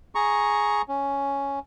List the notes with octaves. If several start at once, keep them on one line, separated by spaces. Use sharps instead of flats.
G#4 A#5 C#6
C#4